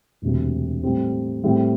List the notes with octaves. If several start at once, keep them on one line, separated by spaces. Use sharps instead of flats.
E1 D2 C3
A2 G3 C4
A2 G3 C4